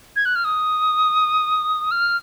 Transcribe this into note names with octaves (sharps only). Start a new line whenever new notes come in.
G#6
F#6
F6
D#6
F6